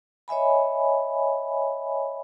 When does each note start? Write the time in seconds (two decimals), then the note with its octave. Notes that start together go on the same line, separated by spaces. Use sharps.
0.28 C#5 D#5 E5 G#5 B5